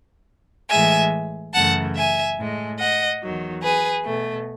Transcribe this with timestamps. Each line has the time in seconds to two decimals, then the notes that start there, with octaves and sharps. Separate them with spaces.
0.70 A2 E3 G#3 E5 G#5
1.54 F#2 C#3 E3 A3 F#5 A5
1.96 E5 G#5
2.38 A2 G#3
2.79 D#5 F#5
3.22 E2 D#3 F#3
3.63 G#4 B4
4.05 B2 A3